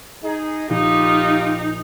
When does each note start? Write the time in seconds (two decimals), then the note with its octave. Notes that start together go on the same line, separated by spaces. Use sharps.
0.23 D#4 G#4
0.69 A#1 D#4 F4 G4